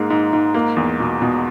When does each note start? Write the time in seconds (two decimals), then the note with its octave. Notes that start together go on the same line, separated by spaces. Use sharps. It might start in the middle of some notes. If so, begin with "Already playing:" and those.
Already playing: G#2 G#3 A#3
0.10 G#2
0.33 G#2
0.54 A#3
0.77 E2
1.00 B2
1.22 B2